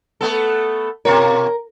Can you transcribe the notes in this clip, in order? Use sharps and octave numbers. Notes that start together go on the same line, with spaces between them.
A3 B3 A4
B2 F4 A#4 C#5